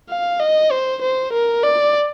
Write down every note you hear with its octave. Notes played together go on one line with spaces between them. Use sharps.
F5
D#5
C5
C5
A#4
D5